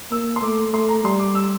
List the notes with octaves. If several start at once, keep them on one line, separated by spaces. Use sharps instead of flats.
A#3 E6
C6
A3 D6
A3 C6
A#5
G3 C6
D6
E6